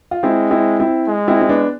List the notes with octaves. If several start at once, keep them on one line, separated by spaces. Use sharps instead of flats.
F4
G#3 C4 E4
C4 E4
C4 E4
G#3
C4 E4
E4
B3 D4